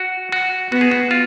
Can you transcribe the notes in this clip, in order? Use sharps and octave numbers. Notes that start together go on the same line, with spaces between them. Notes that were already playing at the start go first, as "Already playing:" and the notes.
Already playing: F#4
F#4
B3 F#4
G#4
F#4
F4